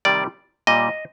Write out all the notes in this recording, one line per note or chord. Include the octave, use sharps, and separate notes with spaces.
C3 D#3 G3 D5
A#2 G3 D#5